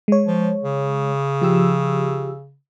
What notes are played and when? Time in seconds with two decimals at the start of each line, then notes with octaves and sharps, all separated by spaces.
0.08 G#3 C#5
0.27 F3
0.63 C#3
1.42 F3 G4 E6